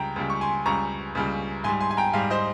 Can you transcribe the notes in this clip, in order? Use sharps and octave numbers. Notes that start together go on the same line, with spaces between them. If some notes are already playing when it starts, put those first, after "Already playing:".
Already playing: C#2 C#3 G3 G5 A#5
C#2 C#3 G3
C#6
G#5 C6
C#2 C#3 G3 A#5 C#6
C#2 C#3 G3
G#2 G3 G#5 C6
G#5 C6
G#5
G5 A#5
G#2 G3 F5 G#5
C5 D#5